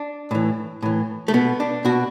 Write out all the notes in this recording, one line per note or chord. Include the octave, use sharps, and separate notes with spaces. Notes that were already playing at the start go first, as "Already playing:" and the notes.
Already playing: D4
A2 E3
A2 E3
A3
B2 B3
D4
B2 F#4